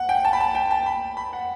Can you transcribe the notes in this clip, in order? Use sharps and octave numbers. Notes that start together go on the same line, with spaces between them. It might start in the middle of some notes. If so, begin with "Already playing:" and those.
Already playing: F#5
G5
A5
B5
A5
G5
A5
B5
B5
F#5